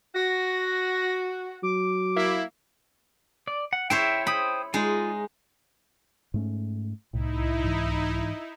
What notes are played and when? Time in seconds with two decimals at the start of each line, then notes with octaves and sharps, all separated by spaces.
0.15 F#4 A#6
1.63 F#3 D6
2.16 A#3 E4
3.48 D5
3.73 F#5
3.90 E4 C5 C#5 E5 G5
4.27 C5 G5 B5 D#6
4.74 G#3 D#4 F4
6.34 G#2 A3 C#4
7.13 C2 A2 D#4 E4
7.64 G#2 E3